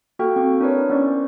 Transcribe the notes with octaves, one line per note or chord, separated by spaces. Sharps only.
A#3 F#4 A4 G5 F6
C4 C#6
D4 E4 A#4 B4 C#5
B3 C#4 D5 C#6
C5